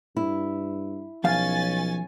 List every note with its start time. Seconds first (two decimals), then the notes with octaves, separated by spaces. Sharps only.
0.17 G2 E4
1.24 B1 F3 C#4 F5 G#5 A6